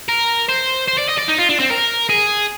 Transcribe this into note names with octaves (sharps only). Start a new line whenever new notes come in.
A#4
C5
C5
D5
D#5
D5
D#4
F4
D4
C4
A#4
G#4